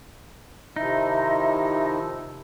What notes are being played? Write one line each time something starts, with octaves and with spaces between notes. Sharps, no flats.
C3 D#3 F3 D#4 E4 E5